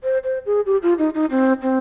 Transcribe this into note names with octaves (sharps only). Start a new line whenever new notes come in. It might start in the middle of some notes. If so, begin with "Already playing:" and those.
C5
C5
G#4
G4
F4
D#4
D#4
C4
C4